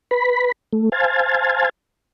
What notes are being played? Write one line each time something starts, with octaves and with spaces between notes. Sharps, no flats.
B4 B5
A3
C5 F5 G#5 A5